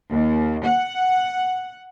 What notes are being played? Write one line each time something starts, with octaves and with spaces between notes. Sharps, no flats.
D#2
F#5